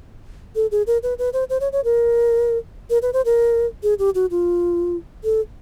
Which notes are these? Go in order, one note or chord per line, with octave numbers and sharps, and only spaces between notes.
A4
G#4
A#4
B4
B4
C5
C5
C#5
C#5
A#4
A#4
B4
C5
A#4
G#4
G4
F#4
F4
A4